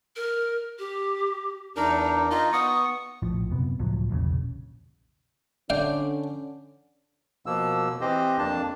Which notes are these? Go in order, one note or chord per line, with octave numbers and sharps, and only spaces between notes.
A#4
G4
E2 D4 D#4 A#4
D#4 F4 D#5
B3 C#6 D#6
A#1 A2 F3
F#2 C3 B3
C#2 A2 F3 F#3
E1 A#1 A2 C#3
D3 C#4 D5 F5 G5
B2 F3 A#3 E6
E3 C4 G4 C5 D#5
F2 A#3 D4 A5